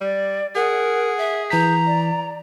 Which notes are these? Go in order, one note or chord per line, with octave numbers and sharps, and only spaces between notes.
G3 D5
G#4 A#4 F#5
E5
E3 A#5 G6 B6
D5